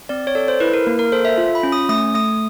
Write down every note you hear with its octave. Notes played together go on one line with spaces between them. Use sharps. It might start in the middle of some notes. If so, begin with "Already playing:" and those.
C4 D5
C#5
A4 D5
C5
E4 B4
A#4
A#3
A#4
A4 C5
E5
F4
B5
C#4
D#6
A3 D#6
A3 D#6